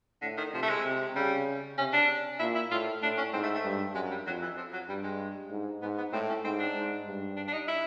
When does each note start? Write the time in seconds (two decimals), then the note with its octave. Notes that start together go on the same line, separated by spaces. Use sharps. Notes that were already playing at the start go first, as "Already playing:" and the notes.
0.22 A2 D3
0.37 D#3
0.53 C3 F3
0.63 A3
0.69 G#3
0.84 C3
1.15 C#3 G3
1.78 C3 C#4
1.93 D4
2.40 A#2 E4
2.55 E4
2.71 A2 F4
3.02 A2 D4
3.17 C#4
3.33 G#2 C4
3.43 A3
3.55 A3
3.65 G2
3.95 F#2 G#3
4.11 G3
4.26 F2 F#3
4.42 E3
4.57 F3
4.73 F#3
4.88 G2 G3
5.04 G#3
5.51 G#2
5.82 G#2 B3
5.98 B3
6.13 A2 C4
6.29 C#4
6.45 G#2 C4
6.59 D4
6.75 G#2
7.06 G2
7.37 D4
7.48 D4
7.53 D#4
7.68 E4